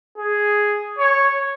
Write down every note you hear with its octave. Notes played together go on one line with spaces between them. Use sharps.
G#4
C#5